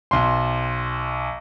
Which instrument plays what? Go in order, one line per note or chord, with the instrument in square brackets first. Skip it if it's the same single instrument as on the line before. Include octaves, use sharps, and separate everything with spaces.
[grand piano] B1 C6